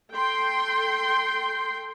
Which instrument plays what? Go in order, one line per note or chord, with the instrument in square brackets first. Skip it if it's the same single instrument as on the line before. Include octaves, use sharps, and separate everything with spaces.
[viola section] A4 G5 C6